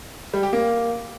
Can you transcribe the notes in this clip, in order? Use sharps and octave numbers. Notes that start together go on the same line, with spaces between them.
G3
G4
A#3